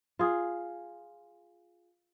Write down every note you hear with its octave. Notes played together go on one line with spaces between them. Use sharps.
F4 G#4